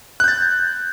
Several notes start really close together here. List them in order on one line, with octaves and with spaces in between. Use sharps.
F#6 G6 A6